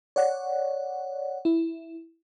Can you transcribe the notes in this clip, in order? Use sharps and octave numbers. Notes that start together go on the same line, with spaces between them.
C#5 D5 F#5
E4